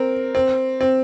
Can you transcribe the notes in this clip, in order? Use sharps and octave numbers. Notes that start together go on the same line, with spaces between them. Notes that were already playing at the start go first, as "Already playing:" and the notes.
Already playing: C4 A#4
C4
C4